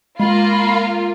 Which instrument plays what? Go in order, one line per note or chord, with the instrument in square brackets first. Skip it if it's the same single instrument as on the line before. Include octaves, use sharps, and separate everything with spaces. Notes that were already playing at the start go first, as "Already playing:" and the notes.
[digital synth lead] G#3 [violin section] A#3 F4 [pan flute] B5